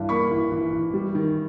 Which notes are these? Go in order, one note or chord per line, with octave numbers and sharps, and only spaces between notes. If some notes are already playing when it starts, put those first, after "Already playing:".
Already playing: G2 E3
A#3 B5 C#6
E3
E3
E3
G3
D#3